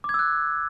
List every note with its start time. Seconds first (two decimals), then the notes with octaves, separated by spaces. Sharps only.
0.04 D6
0.09 G#6
0.14 E6
0.19 F#6